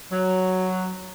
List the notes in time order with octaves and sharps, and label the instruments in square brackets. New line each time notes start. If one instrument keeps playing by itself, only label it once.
[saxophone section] F#3